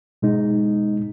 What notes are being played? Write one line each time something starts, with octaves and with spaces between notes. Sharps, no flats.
B2 G#3 D#4